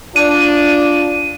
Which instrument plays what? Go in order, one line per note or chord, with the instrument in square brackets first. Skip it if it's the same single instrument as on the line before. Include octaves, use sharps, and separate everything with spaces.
[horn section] D4 [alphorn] F4 [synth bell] D#7